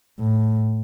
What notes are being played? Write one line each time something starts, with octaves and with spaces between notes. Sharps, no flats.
A2